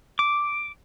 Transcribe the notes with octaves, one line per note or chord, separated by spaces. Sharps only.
D6